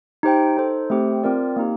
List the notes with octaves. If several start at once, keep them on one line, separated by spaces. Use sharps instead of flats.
D#4 G4 C5 G5
D#4 A4 C5
A3 C4 G4 C5 G5
C4 F4 A#4 D5
A#3 D#4 G4